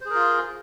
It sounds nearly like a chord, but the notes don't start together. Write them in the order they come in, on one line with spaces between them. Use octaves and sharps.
C5 G#4 A#4 F4